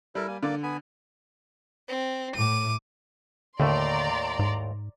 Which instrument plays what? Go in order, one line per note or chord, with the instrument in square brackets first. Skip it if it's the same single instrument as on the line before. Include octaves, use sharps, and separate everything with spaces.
[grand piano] G3 [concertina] E4 A4 A#4
[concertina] A#3 G#5
[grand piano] D3 [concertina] A#3 D5
[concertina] B3 G#5 B5
[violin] C4
[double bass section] A2 [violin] D6 D#7
[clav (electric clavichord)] D#2 A2 A3 [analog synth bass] D3 [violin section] D5 A#5 C6
[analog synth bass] G#2